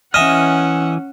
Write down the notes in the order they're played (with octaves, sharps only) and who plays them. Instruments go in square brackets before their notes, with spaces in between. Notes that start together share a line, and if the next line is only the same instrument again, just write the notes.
[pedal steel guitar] E3 G#5 F6 [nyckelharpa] C#4 F#5 [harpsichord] D#5 E5